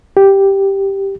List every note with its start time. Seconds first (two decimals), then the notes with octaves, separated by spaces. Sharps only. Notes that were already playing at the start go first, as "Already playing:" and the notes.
0.17 G4